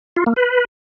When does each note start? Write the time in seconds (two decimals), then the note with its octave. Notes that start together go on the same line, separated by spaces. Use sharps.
0.16 F4
0.26 A#3
0.36 B4